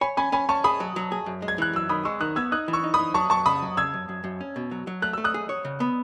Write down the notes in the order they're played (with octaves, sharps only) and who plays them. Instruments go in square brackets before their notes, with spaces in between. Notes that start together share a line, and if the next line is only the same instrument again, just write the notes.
[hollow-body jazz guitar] C#5 [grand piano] G#5 B5
[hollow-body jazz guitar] C#4 [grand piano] G#5 B5
[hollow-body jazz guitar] C#4 [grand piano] G#5 B5
[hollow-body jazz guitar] C#4 [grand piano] A5 C#6
[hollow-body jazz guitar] G#4 [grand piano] B5 D#6
[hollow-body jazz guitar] F#3
F#3
G#4
F#2
G#3
[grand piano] G#6
[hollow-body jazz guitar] E3 [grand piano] F#6
[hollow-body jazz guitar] F#2 [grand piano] E6
[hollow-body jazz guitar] D#3 [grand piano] B5 D#6
[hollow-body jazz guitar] G#3 [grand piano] C#6 E6
[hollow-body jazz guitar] D#3 [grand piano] D#6 F#6
[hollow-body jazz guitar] B3 [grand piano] E6 G#6
[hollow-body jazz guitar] D#4 [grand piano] D#6 F#6
[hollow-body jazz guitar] E3
[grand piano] C#6 E6
[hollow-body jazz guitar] D#4
[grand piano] B5 D#6
[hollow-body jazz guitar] E3
[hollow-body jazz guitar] F#3 [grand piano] A5 C#6
[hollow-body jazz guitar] F#3 [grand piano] A5 C#6
[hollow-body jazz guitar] C#3 [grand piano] B5 D#6
[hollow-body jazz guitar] F#3
[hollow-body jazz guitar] C#3 [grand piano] E6 G#6
[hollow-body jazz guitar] F#2
F#2
F#2
C#4
B2
F#3
F#3
[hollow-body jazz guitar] A3 [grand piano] F#6
[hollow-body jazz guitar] A3 [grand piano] E6
[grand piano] D#6 F#6
[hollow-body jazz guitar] G#4
C#5
C#3
B3